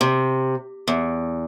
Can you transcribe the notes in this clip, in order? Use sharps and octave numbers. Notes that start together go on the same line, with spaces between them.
C3
E2